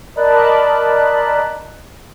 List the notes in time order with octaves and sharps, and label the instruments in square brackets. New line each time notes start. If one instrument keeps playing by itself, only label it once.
[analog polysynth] A#4 D5 D#5 A5 B5 F#6